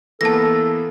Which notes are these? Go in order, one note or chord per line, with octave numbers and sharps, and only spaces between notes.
E3 A#3 B3 A4 A5 A#6
A4